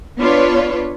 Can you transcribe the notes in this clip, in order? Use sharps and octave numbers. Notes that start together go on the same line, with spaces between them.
B3 D4 F4 B4 C#5 D5